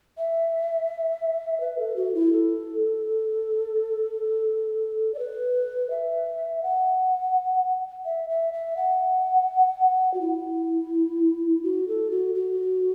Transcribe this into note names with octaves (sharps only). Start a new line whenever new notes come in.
E5
B4
A4
F#4
E4
A4
D5
B4
E5
F#5
E5
E5
E5
F#5
F#4
E4
F#4
A4
F#4
F#4